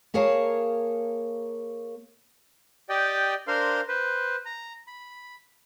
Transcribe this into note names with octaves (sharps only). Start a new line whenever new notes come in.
A#3 G#4 A#4 C#5 F5 A5
G4 D5 D#5 G5
D4 A#4 C5 F5 C6
B4 C5
A#5
B5